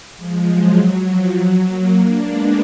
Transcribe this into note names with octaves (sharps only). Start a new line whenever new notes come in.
F3 G#3
F#3
F#3
F3
F#3
F#3 A#3
A#3 D4
G#3 B3